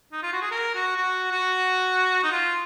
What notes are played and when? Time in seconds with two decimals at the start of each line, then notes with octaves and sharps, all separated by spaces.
0.13 D#4
0.23 F4
0.33 F#4
0.42 G#4
0.51 A#4
0.75 F#4
0.97 F#4
1.31 F#4
2.23 D#4
2.32 F4